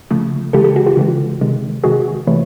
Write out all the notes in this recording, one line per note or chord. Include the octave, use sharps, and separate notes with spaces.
C#3 F3 A3
C#3 E3 G#3 G4 A4
G4 A4
F#4 G#4
F4 G4
C#3 E3 G#3
C3 D#3 G#3
C3 D#3 G#3 F#4 G#4
C3 E3 A3 B4 C#5